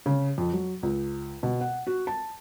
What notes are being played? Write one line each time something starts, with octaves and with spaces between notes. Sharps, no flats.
C#3
F2
F#3
C#2
B2
F#5
F#4
A5